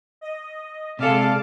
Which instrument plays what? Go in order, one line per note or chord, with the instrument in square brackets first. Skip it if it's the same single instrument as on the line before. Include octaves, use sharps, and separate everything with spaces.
[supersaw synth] D#5
[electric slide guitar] C3 A4 [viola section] G#3 F5 [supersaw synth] D5 A5 D6